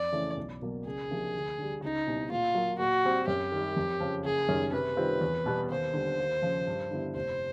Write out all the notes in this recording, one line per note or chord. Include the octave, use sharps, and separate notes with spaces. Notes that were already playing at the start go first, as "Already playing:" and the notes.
Already playing: F2 D5
C#3 E3 A3 C#4
B1
B2 F#3 A#3
C#2 G#4
C3 F3 A#3 D4
D2
D3 G3
C#2 D#4
B2 G3 C4 E4
A#2 F4
F#3 A#3
A#2 F#4
G3 C4
F#2 G4
D#3 G3
F2
C#3 F3
F#1 G#4
F#2 D#3 G3
C3 B4
D#3 G3 C4 F4
E2
B2 G3 B3
D#2 C5
D3 G3
D#2
C#3 F3
G2
D3 G3 B3 E4
F1 C5